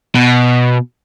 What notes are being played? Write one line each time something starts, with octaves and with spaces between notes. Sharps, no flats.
B2